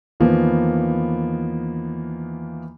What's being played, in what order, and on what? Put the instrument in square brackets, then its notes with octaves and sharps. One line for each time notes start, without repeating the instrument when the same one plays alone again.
[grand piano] E2 D#3 F3 A#3 B3